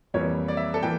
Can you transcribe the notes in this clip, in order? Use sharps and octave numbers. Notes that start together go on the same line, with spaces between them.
F2 E3 G3 A#3 C#5
D5
E5
A4
E3 A#3 G5